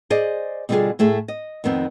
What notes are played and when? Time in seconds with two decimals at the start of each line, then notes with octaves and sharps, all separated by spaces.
0.10 G#4 C5 D5 D#5
0.69 B2 D3 G3 D#4 F4 G#4
0.99 A2 A3 G#4 E5
1.28 D#5
1.64 F2 D#3 B3 C4